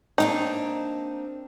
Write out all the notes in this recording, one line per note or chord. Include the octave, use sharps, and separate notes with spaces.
A#3 C4 D4 D#4